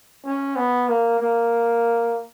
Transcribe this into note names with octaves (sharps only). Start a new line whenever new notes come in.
C#4
B3
A#3
A#3